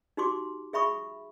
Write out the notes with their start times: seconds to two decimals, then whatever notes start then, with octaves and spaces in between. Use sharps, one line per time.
0.17 D#4 F#4 G4 C6 D6
0.73 G#4 E5 B5 C#6 D#6